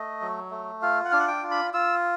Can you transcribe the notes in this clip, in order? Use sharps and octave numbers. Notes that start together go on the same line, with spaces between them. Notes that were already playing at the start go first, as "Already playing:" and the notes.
Already playing: A3 D#5
F#3
A3
F4 F5
F#5
D4 F5
F#5
G5
F4
B5
F4 E6